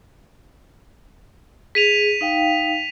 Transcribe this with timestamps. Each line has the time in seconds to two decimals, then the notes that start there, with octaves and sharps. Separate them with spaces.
1.75 G#4 B6 D#7 F7
2.21 D#4 F5 G5